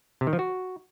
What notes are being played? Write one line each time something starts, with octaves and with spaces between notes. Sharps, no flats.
C3
D#3
F3
F#4